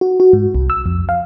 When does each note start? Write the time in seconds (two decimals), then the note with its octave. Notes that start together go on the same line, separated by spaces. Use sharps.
0.01 F#4
0.20 F#4
0.33 G#2
0.55 C2
0.70 E6
0.86 F2
1.09 F5